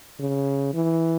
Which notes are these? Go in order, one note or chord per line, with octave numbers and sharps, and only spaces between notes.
C#3
E3